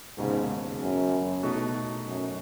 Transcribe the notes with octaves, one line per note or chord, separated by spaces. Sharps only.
E1 D#2 G#2 C#3
F#2
B2 A3 D#4 F#4
F#2